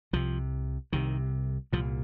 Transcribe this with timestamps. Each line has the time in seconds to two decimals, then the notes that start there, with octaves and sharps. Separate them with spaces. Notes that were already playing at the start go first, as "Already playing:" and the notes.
0.13 C2 C3 F3
0.93 C2 C3 D#3
1.73 C2 A#2 F3